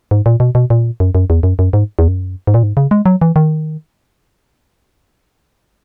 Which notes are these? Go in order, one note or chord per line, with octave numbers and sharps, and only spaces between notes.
G#2
A#2
B2
B2
A#2
F#2
F#2
E2
F#2
F#2
G#2
E2
F#2
G#2
A#2
G#2
C#3
G#3
F#3
E3
D#3